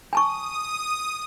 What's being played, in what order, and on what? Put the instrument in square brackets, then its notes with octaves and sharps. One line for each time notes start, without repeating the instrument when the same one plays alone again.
[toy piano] G#5 A5 C#6 [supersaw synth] D#6